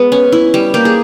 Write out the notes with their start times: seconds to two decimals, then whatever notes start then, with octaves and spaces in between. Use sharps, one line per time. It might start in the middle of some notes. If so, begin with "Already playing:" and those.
Already playing: G#3 B3
0.12 C#4
0.32 E4
0.54 G3
0.74 A#3 G4
0.85 G#4